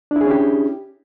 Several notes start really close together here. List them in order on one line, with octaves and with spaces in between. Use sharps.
D4 E4 G#4 C#4 G4